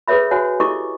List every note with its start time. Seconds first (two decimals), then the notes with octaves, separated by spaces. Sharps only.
0.08 G#4 A4 B4 C#5 E5 B5
0.31 F#4 C5 C#5 F#5 G#5
0.60 E4 G4 A4 D#5 C#6 D6